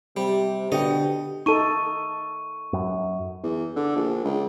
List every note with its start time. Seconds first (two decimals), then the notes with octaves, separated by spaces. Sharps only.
0.17 C3 G3
0.72 B2 D3 G4 D#5 G5
1.46 D#4 A4 C#6 D#7
2.73 F#2
3.43 E2
3.76 D3
3.96 A#1
4.24 C#2